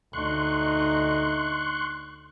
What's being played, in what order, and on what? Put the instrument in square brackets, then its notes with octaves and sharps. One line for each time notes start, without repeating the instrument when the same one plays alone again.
[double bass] D2 D#4 [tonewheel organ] C6 C#6 F#6